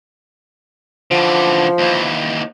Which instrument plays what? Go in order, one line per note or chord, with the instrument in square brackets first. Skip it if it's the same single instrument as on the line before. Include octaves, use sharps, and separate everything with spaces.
[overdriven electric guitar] D3 E3 [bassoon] F3
[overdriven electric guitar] D#2 E3